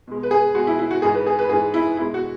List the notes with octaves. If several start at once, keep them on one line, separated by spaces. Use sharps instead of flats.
B2 G#3
B4
G#4
B2 G#3 F#4
E4
E4
F#4
G#2 E3 G#3 G#4
B4
G#4
B4
G#2 E3 G#3 G#4
E4
B2 G#3 E4
F#4